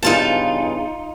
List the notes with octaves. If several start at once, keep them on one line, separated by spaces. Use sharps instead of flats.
E2 G2 C#3 D#4 F4 A5